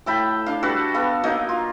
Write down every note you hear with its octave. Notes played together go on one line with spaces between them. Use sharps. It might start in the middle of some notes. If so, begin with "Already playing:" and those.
A2 A4 G5 B5
D4 F5
G3 F#4 A4 B4
B3 A4 F5
F#3 A#3 D#4
F4